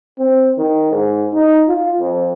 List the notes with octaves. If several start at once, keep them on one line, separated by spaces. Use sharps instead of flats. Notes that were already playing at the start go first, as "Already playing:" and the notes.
C4
D#3
G#2
D#4
F4
F2